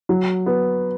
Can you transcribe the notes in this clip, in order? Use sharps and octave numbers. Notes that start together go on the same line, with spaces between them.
F#3
B3